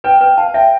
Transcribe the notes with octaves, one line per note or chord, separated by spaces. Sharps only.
B4 G5
B4 G5
F5 A5
E5 G5